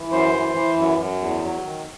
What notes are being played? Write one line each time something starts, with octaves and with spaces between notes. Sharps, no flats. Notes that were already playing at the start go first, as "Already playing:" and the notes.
Already playing: E3
F#2 C5
E3
E3
F#2
F#2
E2
F#3
D#3